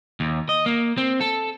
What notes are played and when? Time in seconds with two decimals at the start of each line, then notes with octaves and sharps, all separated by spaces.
0.20 D#2
0.49 D#5
0.66 A#3
0.98 C4
1.21 A4